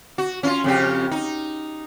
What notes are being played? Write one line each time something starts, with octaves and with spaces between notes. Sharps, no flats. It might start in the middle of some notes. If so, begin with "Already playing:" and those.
F#4
C#4 E4 F4
F2 C#3 G4
D#4